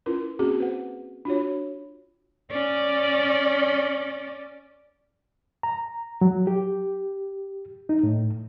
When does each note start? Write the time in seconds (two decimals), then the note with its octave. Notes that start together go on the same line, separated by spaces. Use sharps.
0.06 C#4 E4 F4 A#4 B4
0.39 A#3 C4 C#4 F#4 G#4
0.60 B4 C5 F#5
1.25 D4 F4 F#4 C#5
2.51 C#4 D5
5.63 A#5
6.21 F#3
6.47 G4
7.89 D#4
8.03 A2